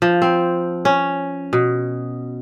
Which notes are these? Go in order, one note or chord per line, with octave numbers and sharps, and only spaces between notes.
F3
C4
C#4
B2